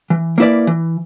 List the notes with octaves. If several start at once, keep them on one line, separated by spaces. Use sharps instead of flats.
E3
A#3 E4 B4 D5
E3